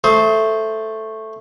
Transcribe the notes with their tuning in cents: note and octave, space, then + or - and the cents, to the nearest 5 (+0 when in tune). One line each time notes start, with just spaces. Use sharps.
A3 +0 C5 +0 D#6 +40